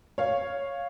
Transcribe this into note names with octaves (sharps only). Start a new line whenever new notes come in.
C#5 F5